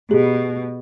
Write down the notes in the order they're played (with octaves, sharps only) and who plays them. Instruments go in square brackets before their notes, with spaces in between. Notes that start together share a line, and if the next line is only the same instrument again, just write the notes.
[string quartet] B2 [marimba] G4 G#4